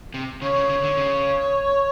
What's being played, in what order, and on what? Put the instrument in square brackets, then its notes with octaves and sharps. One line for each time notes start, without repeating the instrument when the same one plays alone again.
[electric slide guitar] C3
[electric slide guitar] C#3 [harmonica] C#5
[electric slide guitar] C#3
C#3
D3
C#3